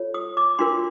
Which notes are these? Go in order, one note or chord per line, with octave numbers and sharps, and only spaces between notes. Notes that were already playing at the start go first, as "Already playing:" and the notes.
Already playing: F4 A4 C#5
D#6
D6
D4 F4 A#4 C6